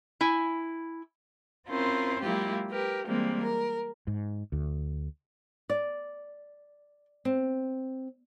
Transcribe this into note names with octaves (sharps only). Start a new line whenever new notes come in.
E4 G#5
C4 C#4 E4 F4 A#4 C5
F#3 G#3 A#3 E4 F4 G4
G4 A#4 B4
A#2 E3 G3 G#3 A#3 C4
A#4
G#2
D2
D5
C4